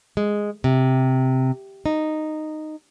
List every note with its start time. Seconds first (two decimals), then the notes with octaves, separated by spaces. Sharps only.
0.17 G#3
0.64 C3
1.86 D#4